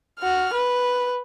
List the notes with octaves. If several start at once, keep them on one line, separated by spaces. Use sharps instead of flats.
F#4 F6
B4